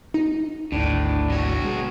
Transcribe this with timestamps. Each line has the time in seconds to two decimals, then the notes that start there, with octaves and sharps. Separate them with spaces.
0.14 D#4
0.72 G#1 D2 A2 D4
1.30 B2 C#5
1.64 G#3